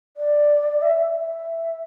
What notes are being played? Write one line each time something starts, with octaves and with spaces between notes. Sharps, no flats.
D5
E5
E5